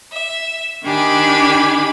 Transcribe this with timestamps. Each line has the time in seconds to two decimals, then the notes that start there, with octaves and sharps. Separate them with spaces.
0.12 E5
0.85 D#3 D4 G4 G#5 B5 D6